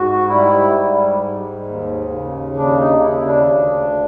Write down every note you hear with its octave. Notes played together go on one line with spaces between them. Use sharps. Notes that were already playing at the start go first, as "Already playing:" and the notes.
Already playing: G#2 F#4
G3 E4
G#2
G#2
D#2
C#3
D#2 D4
D#4
C#3 E4
D4
D2